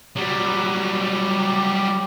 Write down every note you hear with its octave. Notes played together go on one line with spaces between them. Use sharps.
F#3 G3